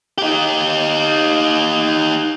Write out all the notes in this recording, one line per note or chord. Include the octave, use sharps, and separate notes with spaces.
D#4 G4